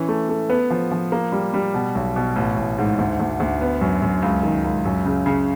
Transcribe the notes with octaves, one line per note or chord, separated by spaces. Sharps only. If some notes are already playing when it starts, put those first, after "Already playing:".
Already playing: E3 C#4
A3
A3
B3
F3
F3
A#3
G3
G3
B2
B1
B2
A1
A1
G#2
D2
D2
D2
B3
F#2
F#2
C#2
D#3
C#2
F#2
C#3
C#3